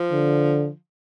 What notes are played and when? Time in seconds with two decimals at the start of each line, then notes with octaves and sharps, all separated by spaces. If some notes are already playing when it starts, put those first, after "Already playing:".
Already playing: F3
0.12 D3